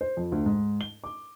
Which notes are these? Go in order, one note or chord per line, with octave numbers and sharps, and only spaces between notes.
C5
F2
D2
G#2
G7
D6